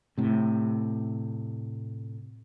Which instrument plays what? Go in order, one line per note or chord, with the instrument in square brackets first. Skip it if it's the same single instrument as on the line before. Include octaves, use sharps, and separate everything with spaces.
[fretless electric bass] A2 C3